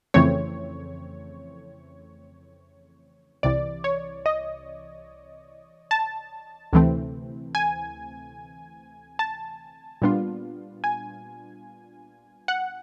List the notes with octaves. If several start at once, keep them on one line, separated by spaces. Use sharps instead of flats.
F2 C#3 E3 A3 C4 C#5
C2 C3 E3 D5
C#5
D#5
A5
D2 C3 E3 A3 C4
G#5
A5
A#2 G3 B3 D4 F4
G#5
F#5